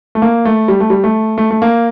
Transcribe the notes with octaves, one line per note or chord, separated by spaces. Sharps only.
A3
A#3
A3
G3
A3
G3
A3
A3
A3
A#3